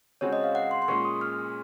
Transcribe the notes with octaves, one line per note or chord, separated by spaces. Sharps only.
C#3 G#3 C4 F#4 C#5
D#5
F5
F#5
C6
C6
A#2 G#3 C#4 C#6
D#6
F6